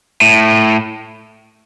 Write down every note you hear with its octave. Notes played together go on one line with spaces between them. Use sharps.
A2